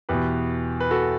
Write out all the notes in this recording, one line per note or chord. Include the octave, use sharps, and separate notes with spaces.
E2 B2 G4 B4
B4
F#4 A4